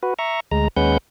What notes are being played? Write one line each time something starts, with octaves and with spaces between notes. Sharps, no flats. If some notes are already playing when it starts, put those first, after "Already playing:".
F#4 B4
E5 A#5 C#6
D2 G#3 A#5
D#2 G#3 C#4 B4 F#5 G6